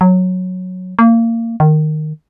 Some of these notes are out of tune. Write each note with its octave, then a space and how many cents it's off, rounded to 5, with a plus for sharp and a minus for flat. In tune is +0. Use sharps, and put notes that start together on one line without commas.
F#3 -10
A#3 -25
D#3 -15